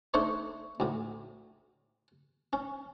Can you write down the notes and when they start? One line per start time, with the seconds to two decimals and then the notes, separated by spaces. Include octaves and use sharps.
0.14 A3 D4 D#4 C5 C#5
0.80 D2 A2
2.53 C#4